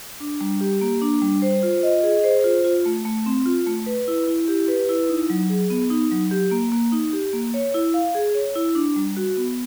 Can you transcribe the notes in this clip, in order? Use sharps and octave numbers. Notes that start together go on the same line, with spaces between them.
D4
G3
G4
A#3
D4
G3
C5
F4
D#5
G#4
C5
F4
F4
A3
A3
C4
F4
A3
B4
E4
E4
G4
B4
E4
D#4
F#3
G#4
B3
D#4
F#3
G4
A#3
A#3
D#4
G4
A#3
C#5
E4
F5
G#4
C#5
E4
D4
G3
F#4
B3